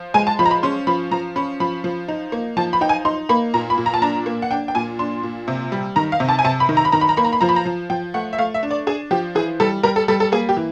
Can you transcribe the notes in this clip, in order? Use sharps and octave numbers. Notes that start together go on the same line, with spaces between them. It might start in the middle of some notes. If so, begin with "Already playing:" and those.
Already playing: F3
G#3 G#5
A5
F3 B5
A#5
B5
C#4 C6
F3 B5
F3 A#5
C#4 B5
F3 B5
F3
D#4
A#3
F3 A5
B5
D#4 G5
G#5
D#4 C6
A#3 B5
A#2 A#5
B5
A#2
A#5
A5
D4 A#5
A#3
F#5
D4 G5
G5
A#2 G#5
D4 C6
A#2
C3
G3
D#3 A#5
F5
C3
A5
G#5
C3 A5
B5
D#3
A#5
B5
D#3 A#5
B5
A#5
A#3 B5
A#5
B5
F3 A#5
B5
A#5
F3
F3 G5
A3 F#5
E5
A3 F5
E5
D4
D5
D4 G#4
F3 G4
E3 G#4
G3 A4
G3 A#4
A4
G3 A4
A4
A#3 G#4
G4
E3